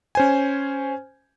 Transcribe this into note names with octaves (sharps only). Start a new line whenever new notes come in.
C#4 C5 G#5